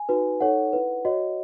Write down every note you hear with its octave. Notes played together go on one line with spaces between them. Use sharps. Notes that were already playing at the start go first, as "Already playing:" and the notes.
Already playing: G#5
D#4 F#4 B4
D#4 A4 C#5 F#5
E4 B4
F#4 C#5 D#5